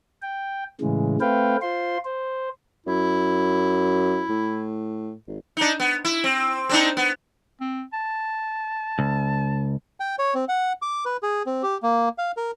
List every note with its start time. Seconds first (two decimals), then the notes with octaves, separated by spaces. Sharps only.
0.22 G5
0.81 A2 C#3 E3 G#3
1.21 A3 C4 B4 F5 G5
1.62 F4 C5 C6
2.05 C5
2.87 F#2 E4
4.29 A2
5.27 G#1
5.57 D4 D#4
5.80 B3
6.05 E4
6.24 C4
6.69 C4 D4 D#4
6.97 B3
7.61 C4
7.93 A5
8.99 C#2
10.00 G5
10.19 C#5
10.35 C4
10.49 F#5
10.82 D6
11.05 B4
11.23 G#4
11.46 C4
11.63 G4
11.83 A#3
12.18 F5
12.37 A#4